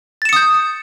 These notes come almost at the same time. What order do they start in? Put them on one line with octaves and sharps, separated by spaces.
A6 E7 C#7 D#6 G6